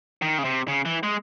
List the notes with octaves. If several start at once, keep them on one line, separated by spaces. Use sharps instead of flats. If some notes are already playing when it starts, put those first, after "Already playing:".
D#3
C#3
C3
C#3
E3
G#3